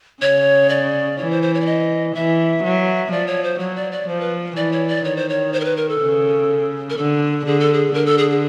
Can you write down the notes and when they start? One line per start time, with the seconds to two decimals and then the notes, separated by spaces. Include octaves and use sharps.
0.22 C#3 C#5
0.69 D5
1.18 E3 C#5
1.31 C5
1.42 C5
1.54 C#5
1.61 D5
1.66 D#5
2.15 E3 E5
2.63 F#3
3.11 F3 D5
3.27 C#5
3.44 C5
3.59 F#3 C#5
3.76 D5
3.92 D5
4.07 F3 C5
4.20 B4
4.56 E3 D5
4.72 C#5
4.88 D5
5.04 D#3 C#5
5.17 C5
5.29 C#5
5.53 C5
5.60 A#4
5.65 B4
5.77 A#4
5.89 A4
6.01 C#3
6.90 A#4
6.97 D3 A4
7.46 D3 G#4
7.60 A4
7.74 G#4
7.94 D3 A#4
8.06 A4
8.18 G#4
8.30 G#4